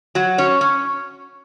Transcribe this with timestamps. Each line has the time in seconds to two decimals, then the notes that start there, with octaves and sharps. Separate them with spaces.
0.15 F#3 F#4
0.38 C#4 C#5
0.61 C#4